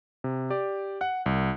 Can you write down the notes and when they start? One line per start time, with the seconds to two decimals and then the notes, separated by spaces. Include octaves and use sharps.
0.24 C3
0.50 G4 D5
1.01 F#5 F#6
1.26 C2